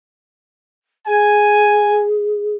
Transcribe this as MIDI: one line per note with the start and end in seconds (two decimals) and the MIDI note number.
1.07 2.55 68
1.07 2.04 80